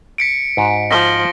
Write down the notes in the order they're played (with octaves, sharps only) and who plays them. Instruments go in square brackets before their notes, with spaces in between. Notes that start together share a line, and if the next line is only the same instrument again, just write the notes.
[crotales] B6 C#7 D7
[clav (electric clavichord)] G#2 F#4
[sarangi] F3 [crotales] A#6 B6 G7